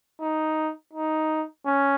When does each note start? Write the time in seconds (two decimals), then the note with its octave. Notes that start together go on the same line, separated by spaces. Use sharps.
0.21 D#4
0.94 D#4
1.67 C#4